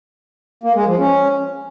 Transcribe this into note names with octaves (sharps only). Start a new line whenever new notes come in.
A#3
G#3
F3
C#4